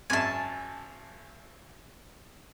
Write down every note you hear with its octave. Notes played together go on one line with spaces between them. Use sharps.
G#1 F#2 E5 G#5 A5